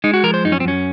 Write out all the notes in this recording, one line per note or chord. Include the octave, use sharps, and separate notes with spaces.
G#3 D#4
F#4
F3 A#4
C5
F#2 D#4
C#4
C4
F#2 C#4